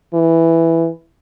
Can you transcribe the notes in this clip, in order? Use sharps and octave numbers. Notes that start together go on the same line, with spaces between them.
E3